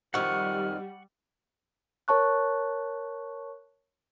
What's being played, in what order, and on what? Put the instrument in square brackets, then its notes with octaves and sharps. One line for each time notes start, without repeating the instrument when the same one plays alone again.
[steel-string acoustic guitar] F2 D#3 [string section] G3 [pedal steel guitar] F#5 C#6 [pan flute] F6
[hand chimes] A#4 C#5 A5 C#6 F#6